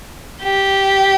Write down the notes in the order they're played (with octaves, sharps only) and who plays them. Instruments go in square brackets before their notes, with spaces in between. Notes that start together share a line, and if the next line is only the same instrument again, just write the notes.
[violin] G4